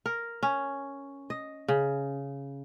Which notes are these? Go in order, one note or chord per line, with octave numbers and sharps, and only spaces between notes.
A#4
C#4
D#5
C#3